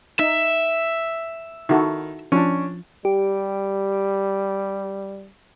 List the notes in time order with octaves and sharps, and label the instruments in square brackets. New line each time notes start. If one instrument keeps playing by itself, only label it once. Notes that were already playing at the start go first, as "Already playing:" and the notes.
[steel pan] D#4 [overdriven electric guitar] E5
[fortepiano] D#3 [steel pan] E4 F#4 A4
[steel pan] F3 [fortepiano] C#4 D4
[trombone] G3 [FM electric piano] G4